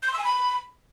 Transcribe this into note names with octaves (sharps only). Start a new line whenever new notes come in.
G6
C6
E6
G#5
B5